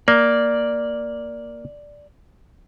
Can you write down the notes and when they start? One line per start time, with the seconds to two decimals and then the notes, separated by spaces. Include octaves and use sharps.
0.08 A#3 D5